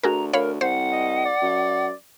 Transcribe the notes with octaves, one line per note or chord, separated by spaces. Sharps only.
D2 F#4 G#4 A#4 A#5
D2 A#4 C#5 F5 B5
C2 C5 F#5
D#5
D5
F#2